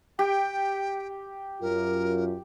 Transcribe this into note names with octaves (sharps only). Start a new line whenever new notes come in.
G4 G5
F#2 F4 A#4